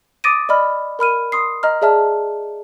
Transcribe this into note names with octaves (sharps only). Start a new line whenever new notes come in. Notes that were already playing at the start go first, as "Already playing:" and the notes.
D6 D#6 A6 A#6 D7 D#7
D5 D#5 B5 F6
A#4 B5 F6 D#7
C6 D#6 C7
D#5 A#5 F6
G#4 D5 E5 A5 F6